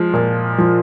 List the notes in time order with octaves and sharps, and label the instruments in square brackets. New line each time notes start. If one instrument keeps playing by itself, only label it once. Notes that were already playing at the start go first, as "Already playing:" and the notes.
Already playing: [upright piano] F3 G#3
A#2
F3